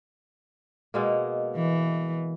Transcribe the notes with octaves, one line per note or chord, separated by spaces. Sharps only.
B2 G#3 A#3
E3